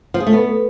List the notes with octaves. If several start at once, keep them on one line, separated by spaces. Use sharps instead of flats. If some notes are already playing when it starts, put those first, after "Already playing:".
F3
G#4
A3
B3